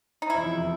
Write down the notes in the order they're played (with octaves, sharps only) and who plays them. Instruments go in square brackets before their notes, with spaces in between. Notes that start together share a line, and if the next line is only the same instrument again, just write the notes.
[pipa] D#4
[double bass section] F1 E2 C3 F3 [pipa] E4